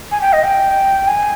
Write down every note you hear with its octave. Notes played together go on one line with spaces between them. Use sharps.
G#5
G5
D#5
G5
G#5